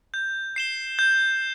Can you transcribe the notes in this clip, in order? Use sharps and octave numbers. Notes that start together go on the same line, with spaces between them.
G6
C7 E7 G7
G6